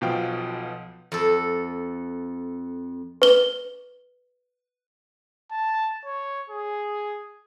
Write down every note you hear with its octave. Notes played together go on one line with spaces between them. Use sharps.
B1 B2 F3 F5 G5
F2 A4
B4 G7
A5
C#5
G#4